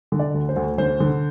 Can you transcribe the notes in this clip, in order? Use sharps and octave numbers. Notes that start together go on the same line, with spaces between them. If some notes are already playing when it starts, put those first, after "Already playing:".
D3
D5
D2
C5
D2
D3 C5
D3